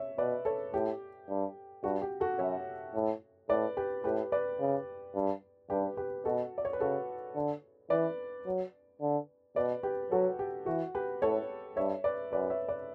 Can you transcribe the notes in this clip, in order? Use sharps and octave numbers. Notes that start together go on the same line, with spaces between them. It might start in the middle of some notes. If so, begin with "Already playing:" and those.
Already playing: C#5 E5
B2 B4 D5
A4 C#5
A2 G4
G2
G2 F#4
G4
F#4 A4
F#2 C#5 E5
A2
A2 B4 D5
G4 B4
A2 G4 B4
B4 D5
C#3
G2
G2 G4 B4
G4 B4
B2 F#4 A4
D5
C#5
B4
C#3 F#4 A4
D3
E3 B4 D5
F#3
D3
B2 B4 D5
G4 B4
F#3 F#4 A4
G4
E3 F#4
G4 B4
A2 A4 C#5
G2 C#5 E5
B4 D5
F#2 B4 D5
C#5 E5
B4 D5